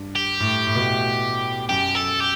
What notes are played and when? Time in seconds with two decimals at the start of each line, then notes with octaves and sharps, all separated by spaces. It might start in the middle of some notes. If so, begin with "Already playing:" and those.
Already playing: G2
0.16 G4
0.40 A2
0.67 A2
0.75 B2
0.85 A2
1.69 F#2 G4
1.95 A4
2.21 G4